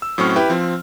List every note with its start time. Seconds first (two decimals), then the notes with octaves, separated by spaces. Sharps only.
0.02 E6
0.18 A2 F#3 C4 C#4 C#6 F6
0.36 E4 G4 B4 G5
0.50 F3 C4